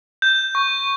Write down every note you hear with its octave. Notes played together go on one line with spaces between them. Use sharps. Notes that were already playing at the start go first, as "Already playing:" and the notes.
G6
C#6